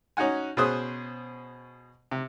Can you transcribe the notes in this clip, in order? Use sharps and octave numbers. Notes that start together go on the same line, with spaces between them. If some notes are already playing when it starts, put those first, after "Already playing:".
C#4 D#4 F#4 F#5 G#5
B2 C#4 G#4 C5 D#6 F#6
C3